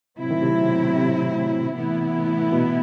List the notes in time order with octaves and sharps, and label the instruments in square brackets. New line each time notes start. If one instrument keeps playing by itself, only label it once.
[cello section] A2 F#3 C4 E4 [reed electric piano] C3
[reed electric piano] D#3
C3
B2
C3
[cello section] A2 E3 B3 E4
[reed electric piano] B2